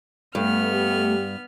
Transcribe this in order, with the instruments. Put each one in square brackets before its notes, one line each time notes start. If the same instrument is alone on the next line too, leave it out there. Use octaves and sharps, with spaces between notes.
[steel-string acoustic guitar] G2 [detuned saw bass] A3 [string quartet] B3 F6
[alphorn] G4